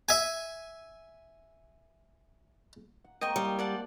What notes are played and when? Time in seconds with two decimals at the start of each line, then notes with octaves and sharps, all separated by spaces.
0.09 E5 G#5
3.04 F#5
3.21 G#3 A#3 C4 D#5 G5 C#6
3.36 G3
3.59 D5 F#5 A5